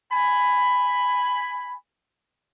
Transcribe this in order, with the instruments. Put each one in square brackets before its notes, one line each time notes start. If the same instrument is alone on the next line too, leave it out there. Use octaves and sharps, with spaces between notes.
[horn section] G#5 B5